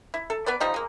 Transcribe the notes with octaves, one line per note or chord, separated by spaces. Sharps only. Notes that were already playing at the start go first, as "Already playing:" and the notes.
E4
A4
B3 B4 D5
F3 G3 D#4
G#3 A#3